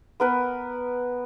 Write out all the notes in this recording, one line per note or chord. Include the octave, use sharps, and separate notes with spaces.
B3 A#4 B4